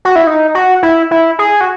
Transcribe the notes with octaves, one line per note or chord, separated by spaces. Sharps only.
F#4
E4
D#4
F#4
E4
E4
G#4
F#4